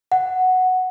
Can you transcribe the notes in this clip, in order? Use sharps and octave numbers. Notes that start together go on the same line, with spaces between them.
F#5